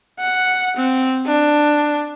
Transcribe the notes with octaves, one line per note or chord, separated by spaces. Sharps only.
F#5
C4
D4